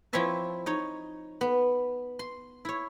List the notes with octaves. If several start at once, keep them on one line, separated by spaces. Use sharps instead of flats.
F3 C4 E4 C#5 E5 A5
D#4 C#5
B3
C6
E4 C#5